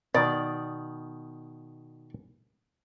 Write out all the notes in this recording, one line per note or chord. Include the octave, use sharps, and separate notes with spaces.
B2 D#3 D5